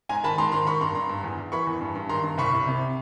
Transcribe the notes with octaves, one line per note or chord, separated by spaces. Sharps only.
G#2 G#5 A#5
D#3 A5 B5
G#2 A#5 C6
D#3 A#5 C6
D#3 B5 C#6
G2 A#5 C6
G2 A#5 C6
G2
E2
E2
E3 B5 C#6
E2
G2
G2
D#3 A#5 C6
G2
C2 B5 C#6
C2
C3